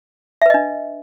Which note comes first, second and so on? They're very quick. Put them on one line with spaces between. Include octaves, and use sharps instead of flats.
E5 B4 D#5 D4